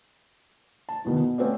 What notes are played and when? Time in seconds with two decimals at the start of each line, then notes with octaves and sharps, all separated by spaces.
0.89 A5
1.05 E2 B2 D#3
1.20 B2
1.38 A3 C4 C#4 F#4 D5